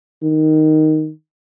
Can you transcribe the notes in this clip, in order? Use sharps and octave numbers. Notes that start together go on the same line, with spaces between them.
D#3